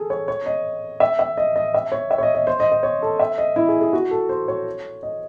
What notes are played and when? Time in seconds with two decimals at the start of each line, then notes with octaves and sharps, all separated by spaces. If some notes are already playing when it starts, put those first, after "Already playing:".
Already playing: G#4 A4
0.10 C#5
0.28 C#5
0.46 D#5
1.00 E5
1.19 E5
1.37 D#5
1.56 D#5
1.74 E5
1.92 C#5
2.11 E5
2.18 C#5
2.23 D#5
2.34 D#5
2.47 C5
2.60 D#5
2.72 D#5
2.83 C#5
3.02 A4
3.20 E5
3.38 D#5
3.56 E4
3.68 G#4
3.81 G#4
3.93 F#4
4.11 A4
4.29 C5
4.48 C#5
5.03 D#5